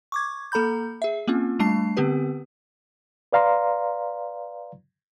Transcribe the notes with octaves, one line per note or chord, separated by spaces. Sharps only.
C#6 D6 G#6
A#3 A4 A#5 B5 G6
G#4 E5
A#3 C4 C#4 F4
G3 A3 D4 A5 C7
D3 B3 C4 G4 B4
B4 D5 F5 A#5 C6